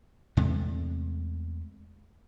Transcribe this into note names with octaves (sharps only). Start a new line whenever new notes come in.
E2 C3 G#3 A3